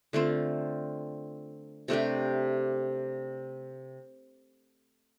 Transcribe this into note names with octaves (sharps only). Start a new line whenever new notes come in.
D3 A3 C4 F4
C3 A3 D4 G4